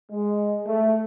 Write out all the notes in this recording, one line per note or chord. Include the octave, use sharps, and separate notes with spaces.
G#3
A3